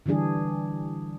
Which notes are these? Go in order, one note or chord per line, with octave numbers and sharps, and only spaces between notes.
D3 E3 G3 D4 G#4